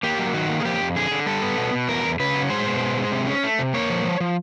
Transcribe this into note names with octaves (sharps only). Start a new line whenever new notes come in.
A#3 G4
F#3
D#3 F#4
A#3
G#4
F3 G4
F2
D3 G#4
D3
G3 A4
B3
B2
B2
E2 A#4
E2
C#3 B4
F#3
G#3 C5
B2
G#3
G#3
C3
C#4
A3
C3
A#3 C#5
F3
F3
F3